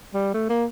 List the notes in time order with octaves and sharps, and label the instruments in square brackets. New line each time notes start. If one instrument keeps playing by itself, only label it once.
[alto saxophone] G3
A3
A#3